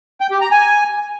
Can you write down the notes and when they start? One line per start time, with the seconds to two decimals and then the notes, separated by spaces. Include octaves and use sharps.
0.21 G5
0.31 G4
0.41 A#5
0.51 G#5